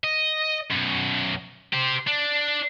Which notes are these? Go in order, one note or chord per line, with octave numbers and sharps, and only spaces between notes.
D#5
F#2 B2
G4 C5
D4